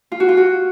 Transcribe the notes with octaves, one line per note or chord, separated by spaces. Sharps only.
F4
F#4
F4
F#4